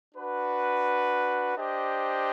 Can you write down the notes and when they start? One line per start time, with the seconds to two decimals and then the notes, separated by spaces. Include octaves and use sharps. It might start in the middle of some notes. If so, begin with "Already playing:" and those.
0.15 D4 F#4 B4
1.57 D4 G4 C5 D#5